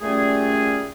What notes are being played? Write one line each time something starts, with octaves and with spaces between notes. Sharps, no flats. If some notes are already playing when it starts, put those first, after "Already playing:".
A#2 G3 A3 C#4 G#4